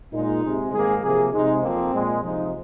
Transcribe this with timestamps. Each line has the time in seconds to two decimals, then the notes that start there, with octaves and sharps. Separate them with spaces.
0.13 A#2 G#3 D#4
0.44 C3 G#3
0.73 G#2 D#3 A#3 G#4
1.03 C3 F3 A#3 G#4
1.33 C3 G#3 D#4
1.63 F2 F3 A#3 C4
1.94 A#2 G#3
2.23 C3 F3 G#3 D#4